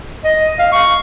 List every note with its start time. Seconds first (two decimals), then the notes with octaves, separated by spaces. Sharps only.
0.24 D#5
0.59 F5
0.72 C#6